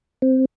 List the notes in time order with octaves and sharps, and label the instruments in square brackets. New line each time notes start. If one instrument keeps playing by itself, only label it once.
[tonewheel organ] C4